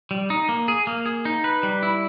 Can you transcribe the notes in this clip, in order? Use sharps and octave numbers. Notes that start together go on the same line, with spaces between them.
G3
D#4
A#3
G#4
A#3
G#4
D#4
B4
G3
E4